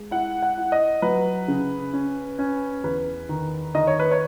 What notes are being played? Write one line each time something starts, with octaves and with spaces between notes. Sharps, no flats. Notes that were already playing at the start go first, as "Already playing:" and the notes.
Already playing: G#3
E4 F#5
F#5
E4
D#5
F#3 B4
C#3
C#4
C#4
E2 B4
D#3
D#3 D#5
C#5
B4
C#5